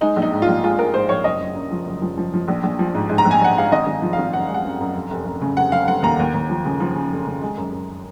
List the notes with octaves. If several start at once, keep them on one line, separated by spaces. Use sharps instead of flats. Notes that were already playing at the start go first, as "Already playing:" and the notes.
G#3 D#4
A#1
D#4
G#2
F4
A#1
G#3 F4
G#3 A#4
G#2 C5
A#1 C#5
F#1 D#5
F#1
F#2
F3
F#1
F3
F3
F3
A#1
A#1
F3
G#2
G#2
A#5
A#1
G#5
A#1 F#5
G#2 F5
G#1 D#5
G#1
F3
F5
G#1
F#2 F#5
G#3
F#5
F#2
F#2
F1
F1
F1
C#3
F1 F#5
F1 F5
F1 F#5
D#2 A#5
D#2
D#2
F3
C#3
F3
C#3
F1
C#3
G#3
F#2
F#2